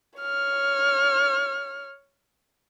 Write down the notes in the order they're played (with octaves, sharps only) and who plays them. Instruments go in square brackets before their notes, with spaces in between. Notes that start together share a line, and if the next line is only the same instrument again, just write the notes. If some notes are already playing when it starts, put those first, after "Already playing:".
[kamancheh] C#5 F6